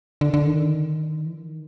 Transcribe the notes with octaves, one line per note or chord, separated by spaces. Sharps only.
D3
D3
D#3
E3
D#3